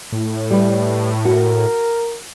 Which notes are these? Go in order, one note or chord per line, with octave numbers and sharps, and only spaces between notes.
A2
G3 B4
F#4 A#4